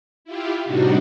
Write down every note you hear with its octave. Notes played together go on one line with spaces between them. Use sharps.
E4 F4 G4
A2 C3 G3 D4 D#4 F#4